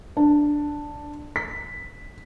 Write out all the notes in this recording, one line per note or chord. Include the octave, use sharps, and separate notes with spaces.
D4
B6